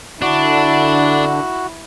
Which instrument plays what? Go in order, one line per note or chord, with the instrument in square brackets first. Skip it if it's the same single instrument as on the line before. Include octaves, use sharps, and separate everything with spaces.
[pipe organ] D3 [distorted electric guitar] D4 [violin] E4 [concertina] F#4